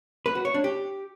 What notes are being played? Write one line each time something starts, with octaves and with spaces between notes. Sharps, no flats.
B4
F#4
C#5
D4
G4